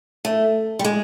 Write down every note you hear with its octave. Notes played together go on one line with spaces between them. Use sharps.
A3
G3
G#3